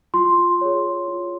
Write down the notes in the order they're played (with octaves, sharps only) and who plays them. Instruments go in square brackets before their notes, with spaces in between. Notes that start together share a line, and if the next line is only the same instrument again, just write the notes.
[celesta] F4 C6
G#4 C#5
F4